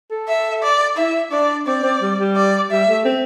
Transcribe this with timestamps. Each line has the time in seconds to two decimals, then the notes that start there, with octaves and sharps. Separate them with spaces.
0.11 A4
0.28 E5
0.63 D5
0.97 E4 E5
1.32 D4 D5
1.67 C4 D5
1.83 C4
2.02 G3
2.19 G3
2.36 D5
2.71 G3 E5
2.88 A3
3.05 C4